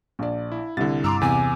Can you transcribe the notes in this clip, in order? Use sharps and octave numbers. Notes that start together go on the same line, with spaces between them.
A#1 D5
E4
C2 D3 E4 A6
G2 A#5 C6 D6 E6
E2 C3 G#5